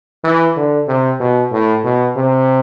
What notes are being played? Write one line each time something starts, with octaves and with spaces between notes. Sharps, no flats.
E3
D3
C3
B2
A2
B2
C3